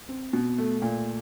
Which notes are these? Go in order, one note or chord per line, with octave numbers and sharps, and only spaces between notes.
C4
B2
A3
A#2